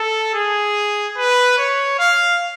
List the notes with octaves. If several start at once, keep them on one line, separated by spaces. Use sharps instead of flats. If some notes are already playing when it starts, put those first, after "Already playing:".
Already playing: A4
G#4
B4
C#5
F5